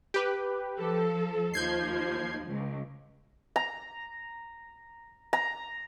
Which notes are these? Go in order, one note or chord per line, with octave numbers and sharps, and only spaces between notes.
G4 B4
F3 A4
D#2 F3 G6 G#6 C7
C#2
A#5
A#5